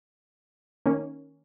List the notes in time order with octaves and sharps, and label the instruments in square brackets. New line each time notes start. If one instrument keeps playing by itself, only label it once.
[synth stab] D#3 A#3 C#4